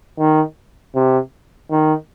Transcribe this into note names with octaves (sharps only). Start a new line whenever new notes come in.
D#3
C3
D#3